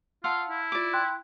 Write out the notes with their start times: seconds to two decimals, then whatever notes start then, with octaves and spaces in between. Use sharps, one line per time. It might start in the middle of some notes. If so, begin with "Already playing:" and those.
0.24 F4 F5 F#5 A5 C6 E6 F6
0.50 E4
0.72 F4 D5 D6 D7
0.93 G5 C6 F#6